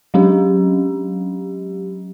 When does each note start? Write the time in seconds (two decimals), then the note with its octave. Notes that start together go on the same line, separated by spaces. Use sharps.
0.14 F#3 G#3 C#4 D4 G4